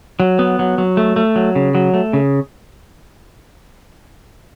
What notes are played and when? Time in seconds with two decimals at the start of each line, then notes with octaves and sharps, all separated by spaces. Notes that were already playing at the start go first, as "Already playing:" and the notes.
0.20 F#3
0.39 B3
0.59 F#3
0.78 F#3
0.97 A3
1.16 A3
1.36 F#3
1.56 C#3
1.75 F#3
1.94 A3
2.13 C#3